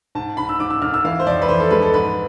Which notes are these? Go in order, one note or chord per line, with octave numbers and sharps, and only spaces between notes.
G#2 A5
G#2 B5
E6
G#2 D6
E6
G#2 F6
E6
E3 F5
C5
F2 D5
B4
E3 C5
A4
G#3 B4
A4
G#2 B4